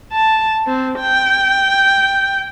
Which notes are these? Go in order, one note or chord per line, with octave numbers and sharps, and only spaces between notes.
A5
C4
G5